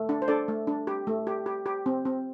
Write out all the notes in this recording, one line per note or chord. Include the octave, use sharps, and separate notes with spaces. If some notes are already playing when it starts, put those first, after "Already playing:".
Already playing: A3
D4
C5
D4 A4 D5
A3
D4
G4
A3
G4
G4
G4
C4
C4